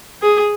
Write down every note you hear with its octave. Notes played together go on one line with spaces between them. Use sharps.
G#4